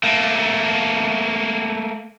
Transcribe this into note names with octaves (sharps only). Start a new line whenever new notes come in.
A3 A#3